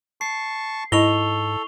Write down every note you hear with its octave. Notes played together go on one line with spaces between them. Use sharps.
A5 C#6 C7
G#2 E4 A4 D#5 C#6 F7 G7